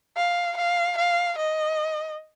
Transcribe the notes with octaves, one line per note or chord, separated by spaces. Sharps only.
F5
F5
F5
D#5